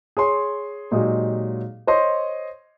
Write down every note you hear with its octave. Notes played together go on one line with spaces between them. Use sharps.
G#4 C#5 C6
A#2 F#3 G#3 D#4 G4 G#4
C5 C#5 D#5 C6